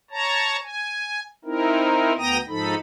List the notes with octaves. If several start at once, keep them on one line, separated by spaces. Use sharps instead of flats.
C#5 A5 A#5
G#5
C4 D#4 E4 A#4
D2 B3 G5 A#5 D#6 A#6
G#2 F3 D#4 A4 B5